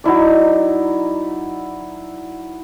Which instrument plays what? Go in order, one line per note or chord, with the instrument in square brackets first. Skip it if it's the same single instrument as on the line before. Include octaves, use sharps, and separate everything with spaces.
[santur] F#3 D#4 E4 D5